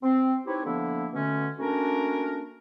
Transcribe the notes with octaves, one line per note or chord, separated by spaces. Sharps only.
C4
C4 D#4 E4 G4 B4 C#5
D3 F3 A#3 B3 D4 E4
B2 D3 A3 C#4
A3 A#3 C#4 D4 F#4 A#4